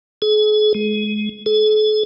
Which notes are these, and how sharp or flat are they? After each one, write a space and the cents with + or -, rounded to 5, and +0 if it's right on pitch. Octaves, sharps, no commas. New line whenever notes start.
G#4 +40
G#3 +25
A4 -45